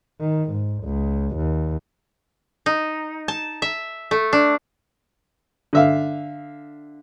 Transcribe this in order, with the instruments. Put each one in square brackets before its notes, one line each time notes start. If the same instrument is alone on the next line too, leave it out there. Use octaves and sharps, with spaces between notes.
[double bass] D#3
G#2
C#2
D#2
[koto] D#4
A5
E5
A3
D4
[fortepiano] D3 E5 F5